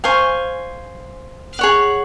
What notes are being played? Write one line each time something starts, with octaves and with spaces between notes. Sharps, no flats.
C5 F5 G#5 C#6
G#4 C#5 F#5